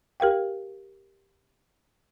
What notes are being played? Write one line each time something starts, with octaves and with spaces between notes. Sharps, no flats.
G4 A#4 F5 G5